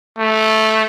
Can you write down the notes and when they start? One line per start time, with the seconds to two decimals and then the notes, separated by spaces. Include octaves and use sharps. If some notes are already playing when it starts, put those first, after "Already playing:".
0.19 A3